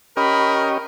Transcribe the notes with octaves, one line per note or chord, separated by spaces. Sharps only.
C#4 G4 A#4 D#5 B5